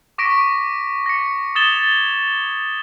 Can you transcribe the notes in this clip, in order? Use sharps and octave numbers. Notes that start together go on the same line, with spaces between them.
C#6 D6 A#6 B6 D7
A#6 C#7
D#6 G#6 A6 E7 G7